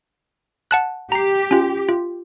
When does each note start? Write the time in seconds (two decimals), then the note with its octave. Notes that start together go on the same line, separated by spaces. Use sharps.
0.71 F#5 A5 F#6
1.12 G4 A#5 C7
1.51 C#4 F4
1.89 F4